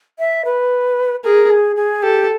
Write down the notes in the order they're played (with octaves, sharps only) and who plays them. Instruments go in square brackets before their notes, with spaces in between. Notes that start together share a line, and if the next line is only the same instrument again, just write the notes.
[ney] E5
B4
[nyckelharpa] G#4 [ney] A#4
[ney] G#4
G#4
[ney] G4 [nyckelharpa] A4